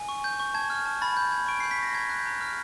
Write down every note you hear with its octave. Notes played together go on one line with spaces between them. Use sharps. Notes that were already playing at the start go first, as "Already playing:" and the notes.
Already playing: G#5
C#6
G6
C#6
A5 G#6
F6
A5
B5 A6
G6
B5 G#6
C#6 D7
G6 C7
B6
C#6 A#6
A#5 G#6
F#6
G6
A#5
F6